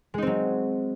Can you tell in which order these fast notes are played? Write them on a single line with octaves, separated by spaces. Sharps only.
G#3 D#4 C4 F#3